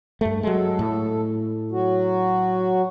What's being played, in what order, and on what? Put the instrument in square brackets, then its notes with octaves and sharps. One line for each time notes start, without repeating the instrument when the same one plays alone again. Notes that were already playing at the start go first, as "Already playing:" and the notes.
[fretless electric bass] G2 A3
[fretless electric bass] F#3 G#3 [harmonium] A4
[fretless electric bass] A2
[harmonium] F#3 F#4